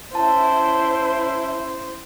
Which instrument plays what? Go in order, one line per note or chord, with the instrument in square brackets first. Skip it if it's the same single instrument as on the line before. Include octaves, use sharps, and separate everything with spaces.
[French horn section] C#4 E4 [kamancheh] C5 [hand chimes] A5